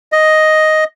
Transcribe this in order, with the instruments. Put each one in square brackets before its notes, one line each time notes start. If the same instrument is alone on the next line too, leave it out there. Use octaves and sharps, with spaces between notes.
[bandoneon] D#5